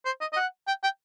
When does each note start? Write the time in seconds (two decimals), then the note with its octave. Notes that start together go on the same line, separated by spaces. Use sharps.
0.06 C5
0.21 D#5
0.33 D#5
0.36 F#5
0.68 G5
0.83 G5